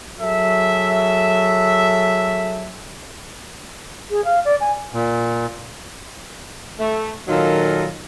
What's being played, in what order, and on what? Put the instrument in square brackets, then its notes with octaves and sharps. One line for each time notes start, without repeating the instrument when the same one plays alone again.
[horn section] F#3 G#4 A4 E5
[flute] G#4
F5
D5
G#5
[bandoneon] A#2
[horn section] A3
A#2 D#3 F#3 D#4 F4 A4